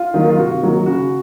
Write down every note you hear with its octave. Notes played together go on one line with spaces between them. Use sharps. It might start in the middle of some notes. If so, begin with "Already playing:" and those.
Already playing: F4
D#3 F#3 A#3
F4
C3 F#4
D#3 F#3 A#3
C#3 F#4